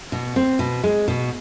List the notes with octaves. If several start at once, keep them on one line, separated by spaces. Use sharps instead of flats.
B2
C4
B2
G#3
B2